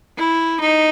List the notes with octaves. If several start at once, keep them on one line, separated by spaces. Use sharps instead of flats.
E4
D#4